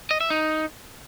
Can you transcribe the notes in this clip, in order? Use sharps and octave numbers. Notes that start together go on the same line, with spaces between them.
D#5
E5
D#4